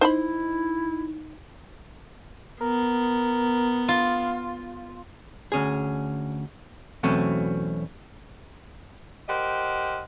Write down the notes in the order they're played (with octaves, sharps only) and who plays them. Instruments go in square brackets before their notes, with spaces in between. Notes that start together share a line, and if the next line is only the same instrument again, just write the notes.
[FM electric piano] D#4 [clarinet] E4 [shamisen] C5 A5 B5
[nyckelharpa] B3 [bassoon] A#4
[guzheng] F4
[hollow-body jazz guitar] D2 C#4 G#4
E2 B2 F#3 A3 C4 C#4
[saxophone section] G4 A#4 C5 D#5 F#5